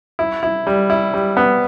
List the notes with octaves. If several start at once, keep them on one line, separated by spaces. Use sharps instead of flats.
E4
E4
G3
E4
G3
B3